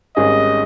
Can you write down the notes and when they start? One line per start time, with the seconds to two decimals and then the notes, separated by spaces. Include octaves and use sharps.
0.16 G#1 G#2 G3 C#4 G#4 D#5